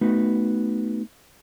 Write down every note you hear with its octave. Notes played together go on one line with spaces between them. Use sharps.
A3 B3 D#4 F#4 B4